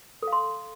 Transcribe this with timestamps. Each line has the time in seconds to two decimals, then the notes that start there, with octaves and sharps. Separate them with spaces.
0.22 A4
0.27 F5
0.33 C6